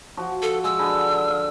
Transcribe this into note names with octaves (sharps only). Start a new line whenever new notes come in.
F3 F#4
A4
G#3 E6
D3 G#4 B4
F5